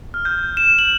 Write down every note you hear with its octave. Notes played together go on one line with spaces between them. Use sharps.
F6
G6
E7
F#7